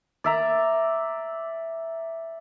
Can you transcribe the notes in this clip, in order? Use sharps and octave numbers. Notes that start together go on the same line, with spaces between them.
D5 E5 A#5